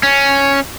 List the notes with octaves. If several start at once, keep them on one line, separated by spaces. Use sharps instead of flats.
C#4